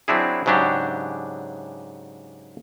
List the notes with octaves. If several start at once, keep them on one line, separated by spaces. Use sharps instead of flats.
F#3 C4 D4 E4 G#4
G#2 C#3 F#3 D4 G4